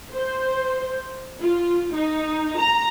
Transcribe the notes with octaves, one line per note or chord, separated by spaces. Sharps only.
C5
F4
D#4
A#5